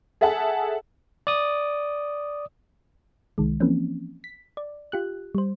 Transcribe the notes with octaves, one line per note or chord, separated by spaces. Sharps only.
G#4 A4 E5 F#5 A5
D5 D#6
C2 D#3 G#3
E3 F3 A#3 C4 C#4
B6
D5
F4 G4 F#6
G3 C5